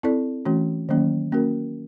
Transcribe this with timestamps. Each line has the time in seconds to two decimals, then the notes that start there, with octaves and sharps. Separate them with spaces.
0.03 C4 E4 A4 D5
0.45 E3 A3 C#4 F#4
0.89 D#3 F#3 A#3 C#4
1.32 A#3 C#4 F#4 A#4